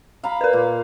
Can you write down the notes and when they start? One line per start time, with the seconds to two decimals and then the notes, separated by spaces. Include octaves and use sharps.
0.23 F5 A#5 B5
0.41 A#4 B4
0.53 A#2